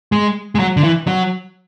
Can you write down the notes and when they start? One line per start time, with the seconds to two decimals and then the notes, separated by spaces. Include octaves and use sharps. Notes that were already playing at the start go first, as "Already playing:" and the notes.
0.12 G#3
0.55 G#3
0.59 F#3
0.77 D3
0.84 E3
1.07 F#3